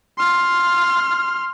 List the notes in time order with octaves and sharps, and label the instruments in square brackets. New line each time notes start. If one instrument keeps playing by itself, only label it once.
[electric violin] C6 F6